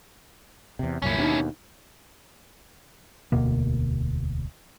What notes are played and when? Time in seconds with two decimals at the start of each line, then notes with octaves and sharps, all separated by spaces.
0.79 E2 C3
1.02 C2 F#2 A#2 C#4 E4
1.18 D#2 B2 D4 D#4
3.32 E1 D2 B2 A#3